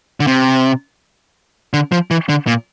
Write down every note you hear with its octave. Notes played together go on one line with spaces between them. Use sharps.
D3
C3
D3
F3
E3
D3
A#2